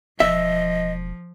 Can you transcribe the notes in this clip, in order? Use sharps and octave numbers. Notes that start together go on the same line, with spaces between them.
E1 F3 D#5 E5